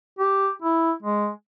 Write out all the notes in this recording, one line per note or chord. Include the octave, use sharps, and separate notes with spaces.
G4
E4
G#3